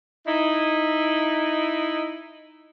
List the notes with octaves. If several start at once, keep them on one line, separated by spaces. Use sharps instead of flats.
D#4 E4